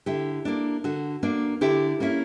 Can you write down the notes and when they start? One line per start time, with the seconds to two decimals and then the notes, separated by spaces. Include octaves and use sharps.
0.06 D3 E4 G4
0.45 A#3 D4
0.84 D3 F#4
1.23 A#3 D4
1.61 D3 E4 G4
2.00 A#3 C#4 E4